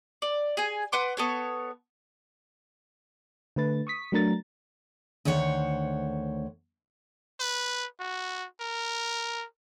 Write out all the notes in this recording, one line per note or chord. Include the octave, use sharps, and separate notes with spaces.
D5
G#4 G#5
B4 F#5 C6 D6
B3 A4 C#5
D3 A3 B4 A6
C#6 D#6 B6
F#3 A3 D4 A#4 A#5 A6
D2 D#3 C5 C#5 F#5
B4
F#4
A#4